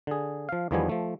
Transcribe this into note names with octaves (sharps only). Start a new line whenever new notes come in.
D3 G#4
F3 F5
E2 D#3 F3 G3 B3 G#5
F3 A3